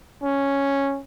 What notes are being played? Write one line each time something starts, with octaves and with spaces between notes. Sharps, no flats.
C#4